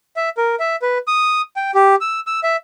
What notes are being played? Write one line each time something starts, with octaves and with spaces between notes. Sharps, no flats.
E5
A#4
E5
B4
D#6
G5
G4
E6
E6
E5